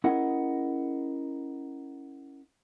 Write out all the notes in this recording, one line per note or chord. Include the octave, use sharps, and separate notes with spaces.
C#4 E4 G#4 A#4 D#5 F#5